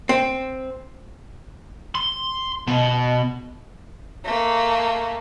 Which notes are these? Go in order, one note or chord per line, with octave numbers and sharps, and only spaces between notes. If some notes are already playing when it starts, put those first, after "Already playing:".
C4
C6
B2
A3 A#3